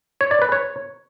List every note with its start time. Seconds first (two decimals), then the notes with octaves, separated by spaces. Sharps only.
0.21 C#5
0.31 D5
0.42 B4
0.52 C#5